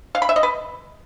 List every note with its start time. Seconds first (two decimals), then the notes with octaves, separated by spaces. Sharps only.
0.15 F5
0.22 B5
0.29 E5
0.36 D#5
0.43 B4